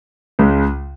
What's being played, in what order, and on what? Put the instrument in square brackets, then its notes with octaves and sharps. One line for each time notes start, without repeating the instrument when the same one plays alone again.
[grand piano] C#2 C#3 G#3